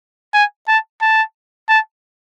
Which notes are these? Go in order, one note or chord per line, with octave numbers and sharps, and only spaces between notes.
G#5
A5
A5
A5